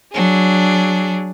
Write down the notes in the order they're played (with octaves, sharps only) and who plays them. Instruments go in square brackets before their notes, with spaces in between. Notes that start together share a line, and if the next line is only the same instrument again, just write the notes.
[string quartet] F#3 D4 G#4